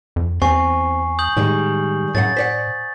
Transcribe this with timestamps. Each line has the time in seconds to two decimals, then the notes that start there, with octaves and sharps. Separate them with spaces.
0.16 F2
0.42 E2 C4 G#5 C#6 C7
1.19 D#6 G6 F#7
1.37 A2 D#3 G3 G#3
2.15 F#2 A2 C#3 F#5 A6
2.37 C5 D5 F#5 B6